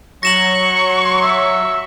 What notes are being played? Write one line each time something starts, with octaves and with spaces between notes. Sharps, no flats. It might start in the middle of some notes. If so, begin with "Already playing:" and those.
F#3 C#6 A#6 E7 F#7
E5